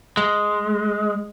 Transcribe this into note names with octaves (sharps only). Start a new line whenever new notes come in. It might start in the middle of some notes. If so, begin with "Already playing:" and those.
G#3